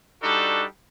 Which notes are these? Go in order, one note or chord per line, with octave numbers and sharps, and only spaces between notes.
G3 D4 D#4 F#4 A4